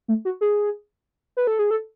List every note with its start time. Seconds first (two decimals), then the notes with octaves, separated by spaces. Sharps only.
0.08 A3
0.25 F#4
0.41 G#4
1.37 B4
1.47 A4
1.59 G#4
1.71 A4